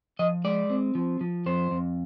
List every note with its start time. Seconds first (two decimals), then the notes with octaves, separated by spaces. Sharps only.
0.19 F3 D#5
0.45 G#3 D5
0.70 C4
0.95 F3
1.21 F3
1.46 F2 C5
1.71 F2